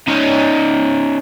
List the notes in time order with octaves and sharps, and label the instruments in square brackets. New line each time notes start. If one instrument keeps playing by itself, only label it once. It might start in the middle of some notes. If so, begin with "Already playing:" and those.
[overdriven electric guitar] C#4 D#4